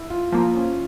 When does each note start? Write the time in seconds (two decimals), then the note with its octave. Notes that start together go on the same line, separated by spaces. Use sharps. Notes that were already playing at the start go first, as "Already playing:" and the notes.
Already playing: E4
0.10 F4
0.32 F3 A#3 F4
0.55 C#4